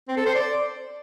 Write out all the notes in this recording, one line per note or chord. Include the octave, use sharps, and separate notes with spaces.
C4
A4
C5
D5